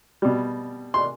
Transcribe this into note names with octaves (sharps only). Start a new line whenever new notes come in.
B2 G3
C6